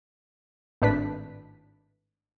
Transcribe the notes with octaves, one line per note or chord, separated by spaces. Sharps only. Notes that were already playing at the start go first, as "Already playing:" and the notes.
G#1 A2 D4 B4 B6